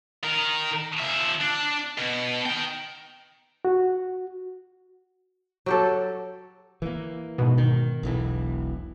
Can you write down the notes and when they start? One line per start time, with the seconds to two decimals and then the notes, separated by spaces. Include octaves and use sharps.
0.24 D#3 A#4
0.99 F3 E5
1.41 D4
1.98 B2
2.46 D#4 G5
3.65 F#4
5.66 F#3 G4 A4
6.82 E3 A#3
7.38 G#2 B2
7.58 D#3
8.03 E1 B1 E3